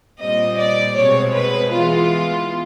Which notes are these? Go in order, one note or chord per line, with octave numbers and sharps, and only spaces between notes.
A#2 G3 C4 D#5
D5
B2 G#3 C4 C#5
B4
E3 G#3 B3 F4